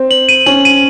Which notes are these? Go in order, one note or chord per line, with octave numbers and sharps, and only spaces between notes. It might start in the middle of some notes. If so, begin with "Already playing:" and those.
Already playing: C4
F#7
D#7
C#4 F#7
D#7